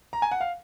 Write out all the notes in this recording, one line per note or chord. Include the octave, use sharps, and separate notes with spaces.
A#5
G#5
F#5
F5